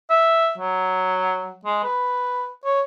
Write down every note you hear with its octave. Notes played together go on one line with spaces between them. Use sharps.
E5
F#3
G#3
B4
C#5